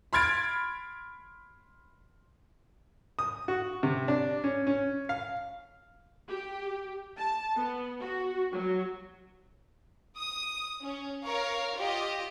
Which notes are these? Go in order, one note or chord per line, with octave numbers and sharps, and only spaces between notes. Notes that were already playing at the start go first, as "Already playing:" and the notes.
B5 C6 F6 G#6 A6 D7
D#6
F#4
C3
D4
C#4
C#4
F5
G4
A5
B3
F#4
F#3
D#6
C#4
A#4 C#5 F5
F4 G4 D#5